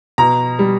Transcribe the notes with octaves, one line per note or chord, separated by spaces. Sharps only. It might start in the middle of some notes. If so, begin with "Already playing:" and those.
B2 A#5
G3